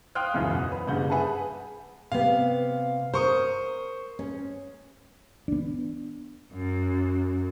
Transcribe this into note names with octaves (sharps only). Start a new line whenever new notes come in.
F5 G5 C6 D#6 F6 F#6
E1 C#2 F#2 E3
F#5
B4
F#1 G2 C#3 F#5 G6
G#4 B4 E5 F#5 A5
C3 B3 F5
A#4 C5 C#6 D#6
C#4
B3 D4
F#2